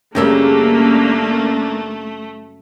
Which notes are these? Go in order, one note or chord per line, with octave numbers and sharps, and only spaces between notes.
F#2 C#3 G3 A3 A#3 C#4 D4 A#4